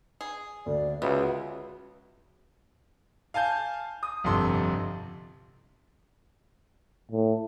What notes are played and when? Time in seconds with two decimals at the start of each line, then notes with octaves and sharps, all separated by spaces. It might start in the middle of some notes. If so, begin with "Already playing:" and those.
0.21 G#4
0.66 D2 D5
1.02 C#2 B3 F#4 E5 F#5
3.34 F5 G#5 A5 G6
4.03 D#6
4.24 G1 F2 C3 A4 C6
7.11 A2